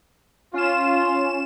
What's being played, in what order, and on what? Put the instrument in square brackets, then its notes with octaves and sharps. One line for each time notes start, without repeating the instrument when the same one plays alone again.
[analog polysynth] C#4 E7 [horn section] F4